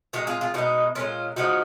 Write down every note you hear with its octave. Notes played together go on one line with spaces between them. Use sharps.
A#2 G#3 D#4 F#4
F4 G#4
F4 G#4
B2 G#3 D#4 F#4
A#2 G#3 C#4 F4
C#3 F3 G#3 D#4 F#4